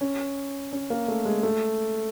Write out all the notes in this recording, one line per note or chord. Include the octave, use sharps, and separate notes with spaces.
C#4
C#4
A#3
A3
G#3
A3